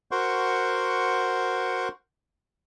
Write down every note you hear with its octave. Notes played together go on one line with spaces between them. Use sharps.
F#4 A#4 C5 F#5 C6 C#6